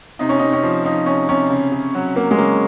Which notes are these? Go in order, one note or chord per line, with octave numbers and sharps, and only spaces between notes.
C3 D#4
C#4
C3 D#4
C#4
F3
F3 D#4
C3 C#4
C3 C#4
C#3
C#3
F#3
F#3 A#3
G#3
C#3 A#3